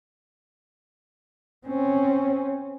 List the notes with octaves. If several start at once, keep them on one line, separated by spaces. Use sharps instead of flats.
C4 C#4